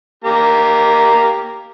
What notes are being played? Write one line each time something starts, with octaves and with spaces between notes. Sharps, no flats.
A#3 G4 A#5